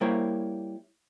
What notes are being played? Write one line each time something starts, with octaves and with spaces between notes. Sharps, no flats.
G3 A#3 E4 A#4 C5 C#5